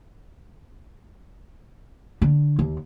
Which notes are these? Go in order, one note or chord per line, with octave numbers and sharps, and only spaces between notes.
D3
D#2